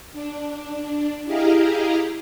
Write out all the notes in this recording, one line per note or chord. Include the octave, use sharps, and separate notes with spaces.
D4
E4 G4 G#4 D#5 F5 A#5